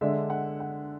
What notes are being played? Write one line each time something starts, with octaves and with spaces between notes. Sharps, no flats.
D3 G#3 D4 E5
F#5
F#5